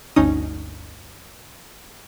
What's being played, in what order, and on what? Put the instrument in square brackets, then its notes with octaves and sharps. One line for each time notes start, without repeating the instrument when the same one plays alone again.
[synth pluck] G1 D2 C#4 D#4 D#6